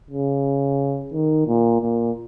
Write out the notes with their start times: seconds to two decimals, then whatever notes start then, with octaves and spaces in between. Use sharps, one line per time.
0.10 C#3
1.13 D#3
1.48 A#2
1.82 A#2